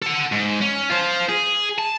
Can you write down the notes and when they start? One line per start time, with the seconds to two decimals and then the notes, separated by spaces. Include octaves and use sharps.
0.02 A4 F#5
0.32 G#2
0.61 C#4
0.89 F4 C5
1.29 G#4
1.78 A5